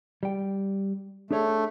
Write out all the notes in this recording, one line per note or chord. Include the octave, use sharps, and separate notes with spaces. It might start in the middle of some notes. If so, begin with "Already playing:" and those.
G3 G5
A3 D4 G#4 C#5